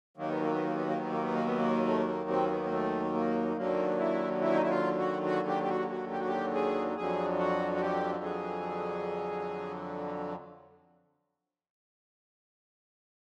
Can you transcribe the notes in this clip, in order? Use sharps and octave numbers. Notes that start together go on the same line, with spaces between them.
D#2 D#3 F#3 A#3
B3
A#3
B3
A#3
B3
A#3
B3
A#3
B3
A#3
B3
A#3
A3
A#3
C4
A#3
B3
A#3
A3
A#3
D#2 D3 F#3 A#3
E4
E4
D#4
E4
F4
F#4
F#4
G4
G4
F#4
F#4
G4
F#4
G4
G#4
F2 D3 F#3 G#4
F#4
F#4
G4
G#4